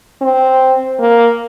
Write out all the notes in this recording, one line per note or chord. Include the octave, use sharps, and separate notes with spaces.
C4
A#3